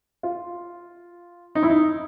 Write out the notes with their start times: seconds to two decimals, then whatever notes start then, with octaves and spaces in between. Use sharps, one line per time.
0.23 F4
1.55 D#4
1.63 E4
1.70 D#4